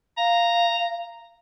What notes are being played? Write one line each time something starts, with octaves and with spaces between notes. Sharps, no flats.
F5 A#5